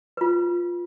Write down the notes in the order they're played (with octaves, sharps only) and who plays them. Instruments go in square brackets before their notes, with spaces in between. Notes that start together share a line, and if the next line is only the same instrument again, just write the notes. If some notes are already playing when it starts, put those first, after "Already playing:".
[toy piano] F4 B4